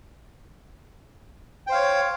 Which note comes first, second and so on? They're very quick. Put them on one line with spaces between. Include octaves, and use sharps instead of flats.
G5 C5 F5 C#5